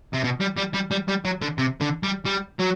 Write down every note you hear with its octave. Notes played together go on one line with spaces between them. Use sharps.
C3
B2
G3
G3
G3
G3
G3
F#3
D3
C3
D3
G3
G3
F#3